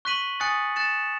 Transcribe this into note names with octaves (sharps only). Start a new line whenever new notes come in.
C#6 F#6 B6 D#7 F#7
G#5 D#6 F#6 A6 C#7
F#6 A6 C#7 E7